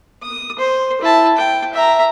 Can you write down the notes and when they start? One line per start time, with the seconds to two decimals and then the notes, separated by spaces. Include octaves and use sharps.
0.23 D#6
0.59 C5
1.01 E4 A5
1.38 G5
1.74 E5 A#5